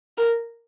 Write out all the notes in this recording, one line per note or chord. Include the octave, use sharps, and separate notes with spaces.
A#4